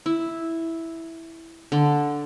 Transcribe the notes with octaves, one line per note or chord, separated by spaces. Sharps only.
E4
D3